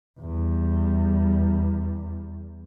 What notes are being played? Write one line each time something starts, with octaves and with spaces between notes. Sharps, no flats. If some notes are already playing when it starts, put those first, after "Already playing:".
E2 G3